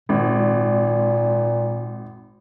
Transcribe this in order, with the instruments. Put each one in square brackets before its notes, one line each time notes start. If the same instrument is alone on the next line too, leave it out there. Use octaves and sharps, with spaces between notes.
[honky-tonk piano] G#1 [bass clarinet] A#2